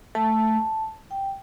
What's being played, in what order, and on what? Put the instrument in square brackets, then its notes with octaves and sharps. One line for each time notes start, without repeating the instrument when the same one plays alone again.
[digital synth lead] A3 [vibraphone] A5
[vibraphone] G5